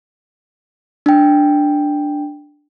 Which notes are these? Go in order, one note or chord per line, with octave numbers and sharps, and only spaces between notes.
D4 G5